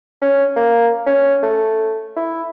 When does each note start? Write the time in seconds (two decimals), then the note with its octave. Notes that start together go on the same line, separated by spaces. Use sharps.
0.21 C#4
0.56 A#3
1.07 C#4
1.43 A3
2.16 E4